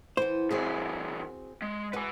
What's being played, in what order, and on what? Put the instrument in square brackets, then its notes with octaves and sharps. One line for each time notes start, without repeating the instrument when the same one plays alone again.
[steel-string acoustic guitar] E3 B3 [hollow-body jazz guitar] C5
[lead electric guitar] C#3 E3 [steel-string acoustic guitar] C4 F#4 G#4
[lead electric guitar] G#3
[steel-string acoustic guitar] G#3 F#4 [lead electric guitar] B4 G#5